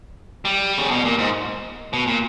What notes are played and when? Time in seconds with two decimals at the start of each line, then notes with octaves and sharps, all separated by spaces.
0.45 G3
0.78 C#3
0.91 B2
1.04 A#2
1.18 G#2
1.93 B2
2.07 A#2